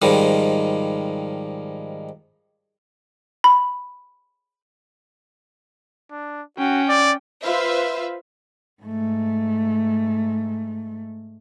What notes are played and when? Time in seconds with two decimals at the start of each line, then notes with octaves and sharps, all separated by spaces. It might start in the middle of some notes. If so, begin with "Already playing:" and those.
0.02 G#2 D#3 F3 G3
3.44 B5
6.11 D4
6.58 C#4 F#4 G5
6.89 D5
7.43 F4 B4 C5 E5 F5
8.83 G#2 A3